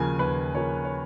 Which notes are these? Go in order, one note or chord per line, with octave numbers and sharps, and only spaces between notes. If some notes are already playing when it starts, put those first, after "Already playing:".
Already playing: D#2 C#3 F3 A#3 G#5
D#2 B4
C#3 F3 A#3 C#5
C#5